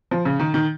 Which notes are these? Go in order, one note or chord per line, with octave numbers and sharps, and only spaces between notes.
F3
C#3
D#3
D#3